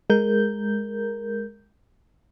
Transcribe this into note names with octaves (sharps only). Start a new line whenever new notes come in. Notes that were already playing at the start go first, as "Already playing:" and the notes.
G#3 A#4 G6